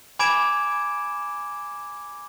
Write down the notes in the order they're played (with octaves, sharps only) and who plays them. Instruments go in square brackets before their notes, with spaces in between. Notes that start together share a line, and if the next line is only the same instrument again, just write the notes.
[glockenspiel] G#5 B5 D6 G#6 D7 E7